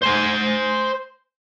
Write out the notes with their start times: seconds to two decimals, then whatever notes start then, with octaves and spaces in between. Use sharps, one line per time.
0.02 C5 G#5